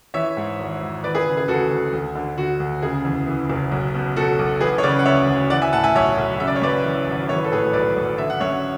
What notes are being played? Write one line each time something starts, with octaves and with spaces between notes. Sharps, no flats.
E3 C#5 E5
G#2
G#1
G#1
E3 B4 D5
G#4 B4
C#3
G#4
D2 F#4 A4
D2
D2
D3
D3 F#4
D2
C#3 G#4
E2
E3
F#1
B1
B2
B2 F#4 A4
B1
E3 G#4 B4
C#5
C#3 B4 D5
F#5
D2 C#5 E5
D2
E3 D5 F#5
E5 G#5
A2 F#5 A5
E5 G#5
B1 C#5 E5
B1
C#3 E5
D5
C#5
F#2 B4 D5
E3
G#1
E3 C#5
B4
A4
A2 G#4 B4
B1 B4 D5
B1
D3 E5
F#5
F#2 C#5 E5